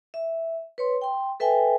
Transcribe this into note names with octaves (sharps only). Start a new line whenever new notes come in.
E5
B4 C#5 C6
G5 C6
A4 B4 E5 G5 G#5